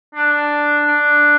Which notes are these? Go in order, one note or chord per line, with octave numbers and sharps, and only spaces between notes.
D4
D4